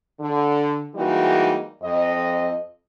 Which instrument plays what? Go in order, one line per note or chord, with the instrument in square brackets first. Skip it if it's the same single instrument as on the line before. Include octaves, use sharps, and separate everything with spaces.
[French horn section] D3
E3 G3 G#3 A#3 D#4 F#4
F2 D#5